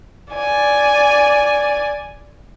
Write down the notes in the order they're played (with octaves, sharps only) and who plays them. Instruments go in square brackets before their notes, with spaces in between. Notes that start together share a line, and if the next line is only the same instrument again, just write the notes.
[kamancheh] D5 G#5